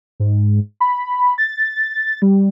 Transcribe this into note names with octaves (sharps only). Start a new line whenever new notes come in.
G#2
B5
A6
G3